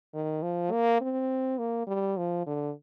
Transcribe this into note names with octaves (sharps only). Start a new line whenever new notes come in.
D#3
F3
A#3
C4
A#3
G3
F3
D3